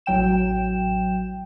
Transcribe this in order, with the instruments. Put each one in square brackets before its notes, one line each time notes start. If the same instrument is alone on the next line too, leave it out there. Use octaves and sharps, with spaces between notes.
[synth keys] A1 F#3 G5 E7